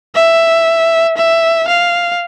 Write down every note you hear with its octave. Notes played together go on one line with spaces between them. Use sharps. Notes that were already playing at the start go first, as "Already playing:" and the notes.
E5
E5
F5